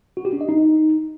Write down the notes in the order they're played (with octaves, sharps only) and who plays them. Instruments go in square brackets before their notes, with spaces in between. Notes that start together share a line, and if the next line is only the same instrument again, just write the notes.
[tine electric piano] F#4
G4
D4
D#5
D#4